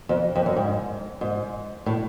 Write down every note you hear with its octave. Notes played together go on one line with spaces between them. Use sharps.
F2
F2
F#2
G#2
G#2
A2